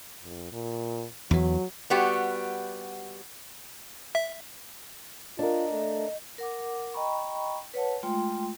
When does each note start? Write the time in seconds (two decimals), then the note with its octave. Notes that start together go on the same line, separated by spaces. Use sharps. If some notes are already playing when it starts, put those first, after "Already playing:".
0.23 F2
0.52 A#2
1.31 E2 E3 F#3
1.90 G3 B3 F#4 G4
4.15 E5
5.39 D4 F4 A#4 D#5
5.72 A3
6.38 A#4 F#5 D6
6.94 D#5 G5 A#5 B5 C#6
7.74 B4 C#5 F#5 A5
8.03 G#3 A3 F4 G5 C6